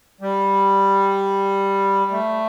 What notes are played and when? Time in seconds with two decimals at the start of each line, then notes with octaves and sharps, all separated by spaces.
0.21 G3
2.11 A3